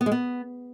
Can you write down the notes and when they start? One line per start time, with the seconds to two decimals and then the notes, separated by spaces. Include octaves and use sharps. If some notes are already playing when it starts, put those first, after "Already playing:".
0.01 B3
0.06 G#3
0.12 B3